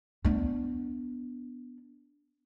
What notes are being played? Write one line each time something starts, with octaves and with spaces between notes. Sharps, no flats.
B3 D4